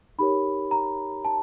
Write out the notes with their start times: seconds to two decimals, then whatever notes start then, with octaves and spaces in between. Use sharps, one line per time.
0.18 D#4 G4 A#4 C#5 B5
0.71 A#5
1.25 A5